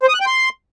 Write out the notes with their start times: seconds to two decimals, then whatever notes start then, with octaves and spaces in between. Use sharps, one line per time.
0.03 C5
0.09 D#6
0.14 F#6
0.20 G5
0.26 C6